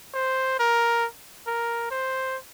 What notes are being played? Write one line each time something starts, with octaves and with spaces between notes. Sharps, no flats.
C5
A#4
A#4
C5